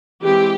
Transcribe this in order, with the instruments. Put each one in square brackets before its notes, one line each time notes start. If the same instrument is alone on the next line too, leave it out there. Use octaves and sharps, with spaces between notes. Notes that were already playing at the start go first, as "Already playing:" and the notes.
[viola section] E3 G#3 C4 G4